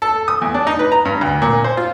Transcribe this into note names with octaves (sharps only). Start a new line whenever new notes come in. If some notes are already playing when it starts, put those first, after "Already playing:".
A4
D#6
E2
D4
D#4
B4
A#5
G2
D2
A#2
C5
F4